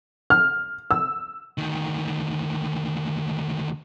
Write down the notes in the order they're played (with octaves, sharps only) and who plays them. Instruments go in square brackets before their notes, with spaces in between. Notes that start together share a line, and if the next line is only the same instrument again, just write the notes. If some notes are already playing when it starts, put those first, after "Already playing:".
[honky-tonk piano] F6
E6
[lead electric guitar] D2 D#3